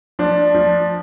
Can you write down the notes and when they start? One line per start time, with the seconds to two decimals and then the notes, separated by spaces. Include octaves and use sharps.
0.19 F3 D4
0.54 F3